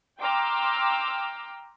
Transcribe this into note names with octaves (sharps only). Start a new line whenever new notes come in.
G5 A#5 C6 D6 E6 F6